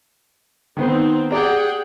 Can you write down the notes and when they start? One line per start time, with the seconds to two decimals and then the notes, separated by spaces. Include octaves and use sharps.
0.77 D#3 B3 C4 D#4 C5
1.31 G4 G#4 D5 F#5 G5 A#5